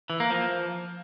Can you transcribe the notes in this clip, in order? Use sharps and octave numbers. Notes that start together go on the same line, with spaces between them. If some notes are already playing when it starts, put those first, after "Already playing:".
E3
A#3
F3